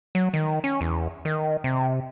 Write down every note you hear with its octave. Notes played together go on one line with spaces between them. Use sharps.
F#3
D#3
C#4
E2
D#3
C3